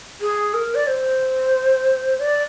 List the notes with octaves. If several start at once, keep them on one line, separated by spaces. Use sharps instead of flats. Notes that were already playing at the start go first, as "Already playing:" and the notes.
G#4
A#4
D5
C5
D5